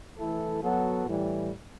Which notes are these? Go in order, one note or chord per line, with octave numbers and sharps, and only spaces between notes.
E3 A3 E4 A4
F#3 B3 F#4 A4
A2 E3 G3